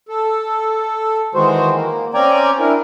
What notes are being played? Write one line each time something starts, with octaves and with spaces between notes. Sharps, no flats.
A4
D#3 E3 G#3 F#4 C5
A#3
C4 C#4 D5 G5 G#5 A#5
D4 E4 A#4